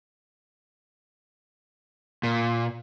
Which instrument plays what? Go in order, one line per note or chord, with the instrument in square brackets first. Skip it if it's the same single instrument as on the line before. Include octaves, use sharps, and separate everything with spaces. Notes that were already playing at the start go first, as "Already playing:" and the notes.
[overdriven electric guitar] A#2